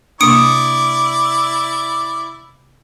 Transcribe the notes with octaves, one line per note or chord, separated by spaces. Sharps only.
C3 A#3 D4 E4 D5 D#6 C#7 D7